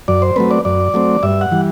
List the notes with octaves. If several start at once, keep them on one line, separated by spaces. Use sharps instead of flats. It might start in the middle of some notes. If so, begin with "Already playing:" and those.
F#2 D5
C5
F#3 A3 C4 B4
D5
F#2 D5
F#3 A3 C4
G2 E5
F#5
E3 G3